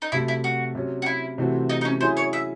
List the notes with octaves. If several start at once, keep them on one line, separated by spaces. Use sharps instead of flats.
D#4
C3 F#3 A3 E4
E4
F#4
C3 F#3 C#4
F#4
E4
C3 E3 A3 C4 F#4
D#4
D#4
C#4
F#3 C#4 E4 G#4 C5
C#5
E5